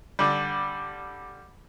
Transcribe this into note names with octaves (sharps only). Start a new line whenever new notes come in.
D3 G3